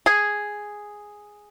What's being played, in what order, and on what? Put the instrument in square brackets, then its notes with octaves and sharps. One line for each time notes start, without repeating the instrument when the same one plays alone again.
[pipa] G#4